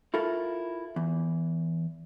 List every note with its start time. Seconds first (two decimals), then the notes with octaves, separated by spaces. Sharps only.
0.14 E4 F4 A4 A#4
0.96 E2